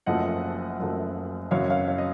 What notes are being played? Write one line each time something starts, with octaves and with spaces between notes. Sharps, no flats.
F#1 F#2 F3 A3 D#5 F#5
F#1 F#2 F3 A3
F#2 C#3 F#3 C#5 F5
C#5 F5
C#5 F5
D#5